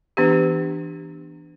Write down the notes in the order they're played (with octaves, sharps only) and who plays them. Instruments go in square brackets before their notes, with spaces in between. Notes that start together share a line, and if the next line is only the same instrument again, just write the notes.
[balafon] E3 B3 D4 G4